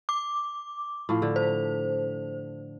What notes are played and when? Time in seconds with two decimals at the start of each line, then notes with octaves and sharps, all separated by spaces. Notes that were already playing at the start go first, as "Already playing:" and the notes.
0.09 D6
1.09 A2 F3
1.22 D3
1.36 C5